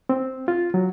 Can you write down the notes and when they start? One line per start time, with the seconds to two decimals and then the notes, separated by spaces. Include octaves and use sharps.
0.09 C4
0.48 F4
0.74 F#3